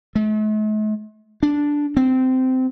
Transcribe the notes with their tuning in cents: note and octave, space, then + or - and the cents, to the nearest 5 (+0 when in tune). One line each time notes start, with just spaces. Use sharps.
A3 -45
D4 -5
C4 -15